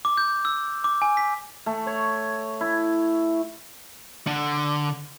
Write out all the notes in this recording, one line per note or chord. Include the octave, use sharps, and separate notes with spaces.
D6
G6
E6
D6
G#5
B6
A3
C#5
E4
D3